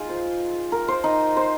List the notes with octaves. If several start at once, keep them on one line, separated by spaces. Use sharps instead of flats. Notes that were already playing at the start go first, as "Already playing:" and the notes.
Already playing: D#4 F4 G#4
C5
A#4
C5
D#4
C5